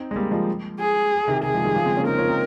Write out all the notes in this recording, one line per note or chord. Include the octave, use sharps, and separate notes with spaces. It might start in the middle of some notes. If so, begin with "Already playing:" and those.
Already playing: C4 D#4
G#3
G3 A#3
F3 G#3
G#4
C3 D#3
C3 G#4
F3 G#3
D#3 G3
C#3 F3
G#3 C4
A#3 C#4
C4 D#4 A#4
C#4 F4
C4 D#4